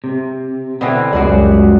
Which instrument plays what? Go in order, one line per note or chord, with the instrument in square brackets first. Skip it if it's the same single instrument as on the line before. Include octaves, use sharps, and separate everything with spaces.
[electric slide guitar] C3
[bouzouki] B2 D3 E3 [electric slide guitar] B3 C4
[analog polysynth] C#2 F#2 [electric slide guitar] G#3 [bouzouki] F#4 G#4 D5
[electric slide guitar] G3